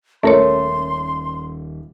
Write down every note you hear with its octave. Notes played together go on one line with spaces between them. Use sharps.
D#1 A3 C#4 A#4 C#5 C6